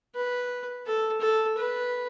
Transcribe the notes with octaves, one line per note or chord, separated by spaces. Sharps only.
B4
A4
A4
B4